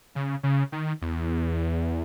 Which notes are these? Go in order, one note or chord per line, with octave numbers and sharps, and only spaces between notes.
C#3
C#3
D#3
E2